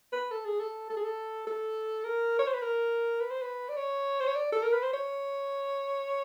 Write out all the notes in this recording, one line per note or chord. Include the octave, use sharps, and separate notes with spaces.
B4
A4
G#4
A4
A4
G#4
A4
A4
A#4
C#5
C5
B4
A#4
B4
C5
B4
D5
C#5
C5
C#5
D5
A4
A#4
B4
C5
C#5